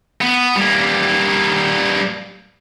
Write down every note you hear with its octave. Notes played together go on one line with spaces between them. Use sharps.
B3
G3 A#3